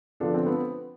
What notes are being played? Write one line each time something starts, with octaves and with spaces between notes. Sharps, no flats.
D3 F3 B3 D4 F4 A4
C4
B3